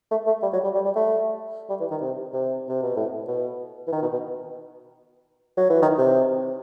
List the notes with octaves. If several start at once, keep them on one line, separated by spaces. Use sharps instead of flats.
A3
A3
G3
F#3
G3
G3
G3
A3
G3
E3
D#3
C3
C3
C3
B2
A2
B2
E3
D#3
B2
B2
F#3
E3
D#3
C3